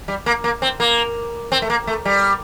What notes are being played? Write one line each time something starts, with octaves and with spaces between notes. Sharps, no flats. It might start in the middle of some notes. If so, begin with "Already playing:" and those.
G3
A#3
A#3
C4
A#3
C4
A3
A#3
A3
G3